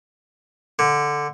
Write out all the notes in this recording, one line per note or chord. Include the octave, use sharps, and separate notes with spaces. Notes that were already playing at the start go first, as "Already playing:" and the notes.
D3